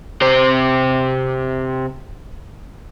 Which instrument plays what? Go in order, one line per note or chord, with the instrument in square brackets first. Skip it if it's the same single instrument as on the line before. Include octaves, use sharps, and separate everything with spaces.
[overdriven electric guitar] C3 C5